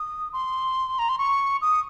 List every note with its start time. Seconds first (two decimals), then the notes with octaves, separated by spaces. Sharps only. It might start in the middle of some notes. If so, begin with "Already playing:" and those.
Already playing: D#6
0.33 C6
0.99 A#5
1.09 C6
1.18 C#6
1.61 D#6